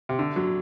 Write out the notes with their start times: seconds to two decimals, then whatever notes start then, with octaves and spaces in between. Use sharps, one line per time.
0.09 C3
0.19 D3
0.36 F#3